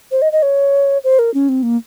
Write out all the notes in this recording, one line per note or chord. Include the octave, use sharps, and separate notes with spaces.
C5
D#5
D#5
C#5
C5
A#4
C#4
C4
A#3